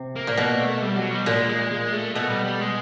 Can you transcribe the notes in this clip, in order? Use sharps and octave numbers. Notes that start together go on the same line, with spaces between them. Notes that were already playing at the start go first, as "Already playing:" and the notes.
Already playing: C3
A#3
A#2
B2 A#3
A3
G3
F#3
G3
A#2 G#3
G#3
G#3
A3
B2 A3
G3
G3
G#3